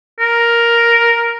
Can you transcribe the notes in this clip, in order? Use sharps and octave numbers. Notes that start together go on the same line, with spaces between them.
A#4